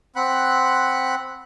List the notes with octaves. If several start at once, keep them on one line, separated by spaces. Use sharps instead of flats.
C4 F#5 B5 F#6